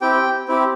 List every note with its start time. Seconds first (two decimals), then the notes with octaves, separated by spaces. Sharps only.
0.01 C4 E4 G4 G5
0.48 C4 E4 G4